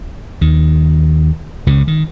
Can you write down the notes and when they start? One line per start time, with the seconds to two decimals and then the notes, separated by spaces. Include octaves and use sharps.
0.41 D#2 D#3
1.67 C#2 C#3
1.87 D#3